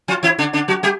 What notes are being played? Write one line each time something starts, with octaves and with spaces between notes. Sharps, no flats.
F3 F4
E3 E4
D3 D4
D3 D4
F#3 F#4
G3 G4